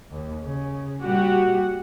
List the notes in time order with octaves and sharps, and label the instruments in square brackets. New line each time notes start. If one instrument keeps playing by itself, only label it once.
[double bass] D#2
C#3
[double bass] A#2 G3 [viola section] F#4 G4 F#5